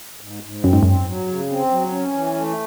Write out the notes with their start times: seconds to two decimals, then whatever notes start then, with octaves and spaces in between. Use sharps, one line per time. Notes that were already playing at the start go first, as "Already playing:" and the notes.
0.21 G#2
0.43 G#2
0.63 F#2 C4
0.73 G#2
0.83 F#2 C4
1.06 F#3
1.28 C#3
1.50 C4
1.70 F#3
1.92 C#4
2.13 E3
2.35 A3